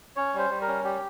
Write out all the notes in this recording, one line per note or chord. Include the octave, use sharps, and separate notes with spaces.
C#4 C#5
G3 C5
G3
A#4
C#4
G3 G4